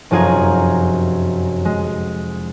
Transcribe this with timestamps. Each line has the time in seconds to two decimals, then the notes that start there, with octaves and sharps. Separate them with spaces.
0.11 F1 F#2 F4 G#4 G#5 A#5
1.65 G#3